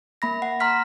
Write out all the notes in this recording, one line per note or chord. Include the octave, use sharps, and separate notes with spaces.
A#3 B5 A#6
F#5
A#5 C6 F6 B6